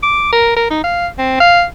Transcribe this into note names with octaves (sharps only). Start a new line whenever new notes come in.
D6
A#4
A#4
D#4
F5
C4
F5